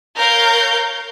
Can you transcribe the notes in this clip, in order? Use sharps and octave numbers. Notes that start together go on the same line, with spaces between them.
A#4 C#5 F5 G6